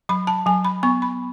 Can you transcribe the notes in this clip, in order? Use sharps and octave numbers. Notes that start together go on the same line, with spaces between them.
F#3 B5
A5
F#3 G#5
B5
B3 C#6
B5